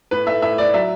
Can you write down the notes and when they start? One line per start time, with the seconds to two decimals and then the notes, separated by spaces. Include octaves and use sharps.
0.11 A2 B4
0.27 A3 E5
0.42 A2 E5
0.58 A2 D5
0.74 F#3 E5